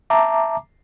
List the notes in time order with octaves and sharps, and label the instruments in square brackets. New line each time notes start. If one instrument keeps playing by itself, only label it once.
[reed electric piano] E5 A5 A#5 D6